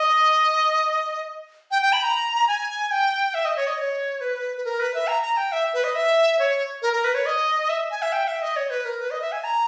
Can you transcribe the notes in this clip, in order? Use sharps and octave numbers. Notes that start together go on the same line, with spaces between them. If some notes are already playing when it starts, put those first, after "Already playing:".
Already playing: D#5
G5
G5
B5
A#5
G#5
G5
E5
D#5
C#5
D#5
C#5
B4
B4
A#4
B4
E5
A#5
A#5
G5
E5
B4
D#5
E5
C#5
A#4
A#4
B4
C#5
D#5
E5
G#5
E5
G5
E5
D#5
C#5
B4
A#4
B4
D#5
E5
G#5
A#5